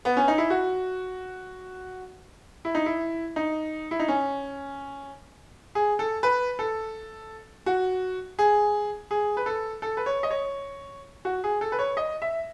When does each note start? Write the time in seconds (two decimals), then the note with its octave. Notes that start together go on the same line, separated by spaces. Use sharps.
0.05 B3
0.17 C#4
0.28 D#4
0.38 E4
0.50 F#4
2.65 E4
2.75 D#4
2.86 E4
3.36 D#4
3.91 E4
4.00 D#4
4.08 C#4
5.75 G#4
5.99 A4
6.23 B4
6.59 A4
7.66 F#4
8.39 G#4
9.11 G#4
9.37 B4
9.46 A4
9.82 A4
9.97 B4
10.06 C#5
10.23 D#5
10.30 C#5
11.25 F#4
11.44 G#4
11.61 A4
11.72 B4
11.79 C#5
11.97 D#5
12.22 E5